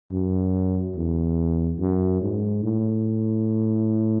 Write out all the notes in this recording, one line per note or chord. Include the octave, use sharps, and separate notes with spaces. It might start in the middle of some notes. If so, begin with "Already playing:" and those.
F#2
E2
F#2
G#2
A2